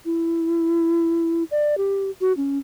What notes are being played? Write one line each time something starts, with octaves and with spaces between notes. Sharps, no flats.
E4
D5
G4
F#4
C#4